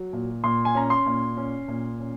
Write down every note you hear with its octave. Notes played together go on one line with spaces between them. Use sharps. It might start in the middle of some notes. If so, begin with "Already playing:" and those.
Already playing: F#3
A#2
A#2 C6
G#5
C#4 A#5
C6
A#2
C#4
A#2
C#4